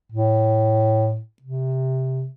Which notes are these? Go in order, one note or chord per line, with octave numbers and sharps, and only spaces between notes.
A2
C3